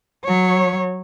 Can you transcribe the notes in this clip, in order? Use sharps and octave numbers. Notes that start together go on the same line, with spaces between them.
F#3 C#5